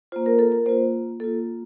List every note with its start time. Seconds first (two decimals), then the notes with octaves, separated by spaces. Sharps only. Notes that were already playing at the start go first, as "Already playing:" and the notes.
0.12 F4 C5
0.16 A#3
0.26 A#4
0.39 A4
0.52 A#4
0.66 A#3 F4 C5
1.20 A#3 F4 A4